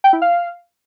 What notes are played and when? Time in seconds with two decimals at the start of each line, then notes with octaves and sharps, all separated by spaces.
0.04 G5
0.13 E4
0.22 F5